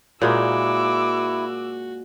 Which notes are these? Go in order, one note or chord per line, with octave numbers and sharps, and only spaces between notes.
A#2 G#3 A#3 E4 F#4 D6 E6